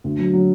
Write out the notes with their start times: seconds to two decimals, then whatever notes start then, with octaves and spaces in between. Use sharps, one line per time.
0.04 D2
0.19 F#3
0.33 F#3